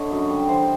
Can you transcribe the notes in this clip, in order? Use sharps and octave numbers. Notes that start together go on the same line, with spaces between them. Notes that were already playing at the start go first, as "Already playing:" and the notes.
Already playing: D3 C#5 D#5
F#2
G3
E3 A#4 C5